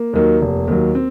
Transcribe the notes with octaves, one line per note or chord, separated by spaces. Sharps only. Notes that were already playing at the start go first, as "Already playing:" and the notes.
Already playing: A#3
D#2 D#3 F#3
F1
D#2 D#3 F#3
C4